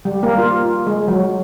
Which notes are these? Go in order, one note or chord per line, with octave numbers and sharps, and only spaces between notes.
G3
A#3
F4
G#3
F#3